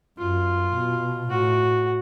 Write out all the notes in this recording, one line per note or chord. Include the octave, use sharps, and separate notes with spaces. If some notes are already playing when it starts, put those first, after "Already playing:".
F#2 F4
B2
A2 F#4